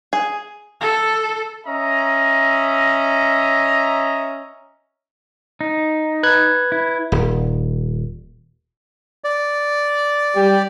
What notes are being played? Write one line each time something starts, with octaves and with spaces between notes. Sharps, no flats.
G#4
A4
C#4 D#5 E5 A#5
D#4
B4 F#6 G#6
E4
D#1
D5
G3 G4